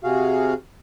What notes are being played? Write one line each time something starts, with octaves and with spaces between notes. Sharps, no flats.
C3 F#4 G#4 F5